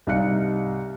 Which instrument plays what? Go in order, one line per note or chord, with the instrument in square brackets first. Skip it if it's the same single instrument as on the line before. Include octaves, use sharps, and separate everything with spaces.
[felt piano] C2 D#4 F5 F#6 C#7